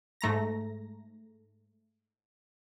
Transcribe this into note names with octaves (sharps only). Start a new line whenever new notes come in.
G#2 A3 A#5 A#6